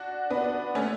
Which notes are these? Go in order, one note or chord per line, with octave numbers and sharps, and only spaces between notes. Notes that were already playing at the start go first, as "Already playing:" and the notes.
Already playing: D4 F#4
B3 D4
A3 C#4